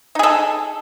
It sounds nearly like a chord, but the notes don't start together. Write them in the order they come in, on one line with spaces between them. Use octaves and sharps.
D#4 G#4 A4